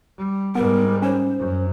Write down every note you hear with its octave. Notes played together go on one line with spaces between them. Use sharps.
G3
G#2 G3 B3 A#4
C#4 C5
F#2